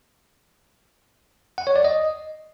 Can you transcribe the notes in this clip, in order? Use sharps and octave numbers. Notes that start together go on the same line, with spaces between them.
F#5
C#5
D5
D#5